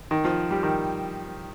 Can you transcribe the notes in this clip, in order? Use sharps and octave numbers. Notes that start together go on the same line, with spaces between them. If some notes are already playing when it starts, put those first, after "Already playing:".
D#3
F3
G3
D#3